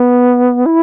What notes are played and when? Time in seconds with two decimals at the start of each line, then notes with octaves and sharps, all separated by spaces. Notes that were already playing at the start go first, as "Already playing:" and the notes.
Already playing: B3
0.66 E4